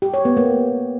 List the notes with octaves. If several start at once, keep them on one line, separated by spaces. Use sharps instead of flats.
G4
C#5
B3
A#3